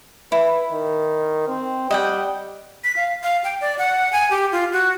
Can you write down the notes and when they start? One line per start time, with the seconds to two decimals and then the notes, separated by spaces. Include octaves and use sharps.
0.32 E4 B4
0.72 D#3
1.48 C4
1.91 G3 D#5 F#5 G5
2.84 B6
2.96 F5
3.23 F5
3.44 G5
3.61 D5
3.79 F#5
4.13 G#5
4.31 G4
4.52 F4
4.73 F#4